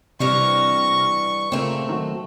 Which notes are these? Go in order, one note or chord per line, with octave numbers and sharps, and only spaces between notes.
G2 C3 E3 G3 C#6 F6 A#6
A#2 C#3 A3 A#3 C4
D#3 F#3 F#4